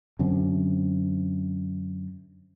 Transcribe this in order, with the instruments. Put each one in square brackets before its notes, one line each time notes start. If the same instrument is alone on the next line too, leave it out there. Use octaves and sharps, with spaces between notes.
[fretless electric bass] F#2 D3 C4